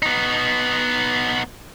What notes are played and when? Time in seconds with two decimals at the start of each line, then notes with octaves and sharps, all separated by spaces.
0.03 B3 D#4